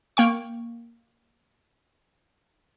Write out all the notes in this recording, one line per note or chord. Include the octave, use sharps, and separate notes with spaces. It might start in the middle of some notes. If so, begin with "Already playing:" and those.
A#3 G5 C#6